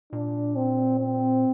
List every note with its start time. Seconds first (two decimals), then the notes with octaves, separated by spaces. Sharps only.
0.13 A#2 D4
0.56 C4
1.00 C4